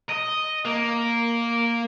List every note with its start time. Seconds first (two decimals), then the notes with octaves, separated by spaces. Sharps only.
0.09 D#5
0.65 A#3